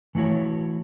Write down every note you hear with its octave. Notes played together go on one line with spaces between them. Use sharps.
E3 A3 E4 F#4 C#5